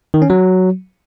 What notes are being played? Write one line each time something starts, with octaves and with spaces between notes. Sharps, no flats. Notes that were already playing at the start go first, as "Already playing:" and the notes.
D#3
C#4
F#3